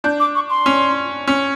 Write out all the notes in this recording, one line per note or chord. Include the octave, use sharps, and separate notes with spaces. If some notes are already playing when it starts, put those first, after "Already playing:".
D4 G6
D6
C#6
C6
C#4
C#4